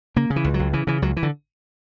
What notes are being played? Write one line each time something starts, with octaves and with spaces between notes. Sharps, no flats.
C#3 A#3
C#3
E3
C#2
F#3
C#2
C#3 E3
C#3 E3
C#2 F#3
E3
D3